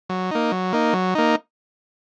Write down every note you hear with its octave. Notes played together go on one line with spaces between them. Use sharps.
F#3
A#3 D#4
F#3
A#3 D#4
F#3
A#3 D#4